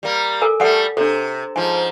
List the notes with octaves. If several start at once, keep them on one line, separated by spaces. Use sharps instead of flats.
G3 A#3
A4 A#4 G#5
G3 A3 A4 F#5 G#5
C3 D4 A4
G#2 F3 G#5